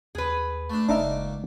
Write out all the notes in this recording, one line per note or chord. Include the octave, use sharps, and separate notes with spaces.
D#2 G#4 B4
A3 D4
F#1 C#2 A#3 D4 D#4 E5 D6